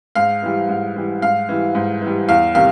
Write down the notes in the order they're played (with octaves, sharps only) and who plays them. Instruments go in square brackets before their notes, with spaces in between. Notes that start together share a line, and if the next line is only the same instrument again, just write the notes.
[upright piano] G#2 F5
E3 G3
G#2
E3 G3
G#2 F5
E3 G3
G#2
E3
G3
E2 F5
C3 D#3 G3 F5